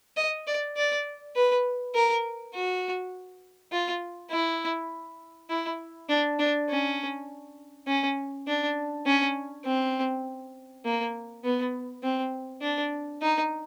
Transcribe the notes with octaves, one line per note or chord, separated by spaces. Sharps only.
D#5
D5
D5
B4
A#4
F#4
F4
E4
E4
D4
D4
C#4
C#4
D4
C#4
C4
A#3
B3
C4
D4
D#4